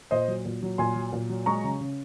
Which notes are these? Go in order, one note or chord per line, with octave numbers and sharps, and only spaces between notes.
A#2 C5 D#5
F#3
A#2
F#3
A#2 G#5 C6
F#3
A#2
F#3
G#3 A#5 C#6
C#3
C#3